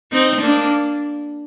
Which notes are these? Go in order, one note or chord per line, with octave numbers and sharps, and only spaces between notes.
C4 D#4
A#3 D4